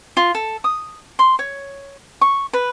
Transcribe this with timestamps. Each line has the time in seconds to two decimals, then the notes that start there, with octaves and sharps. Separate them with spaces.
0.17 F4
0.35 A4
0.64 D#6
1.19 C6
1.39 C#5
2.21 C#6
2.53 B4